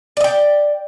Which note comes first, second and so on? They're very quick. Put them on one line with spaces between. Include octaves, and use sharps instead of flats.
D5 D#5 G5